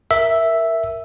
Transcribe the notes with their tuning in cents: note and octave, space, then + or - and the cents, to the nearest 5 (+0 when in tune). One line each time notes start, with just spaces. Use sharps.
A#4 +0 E5 +0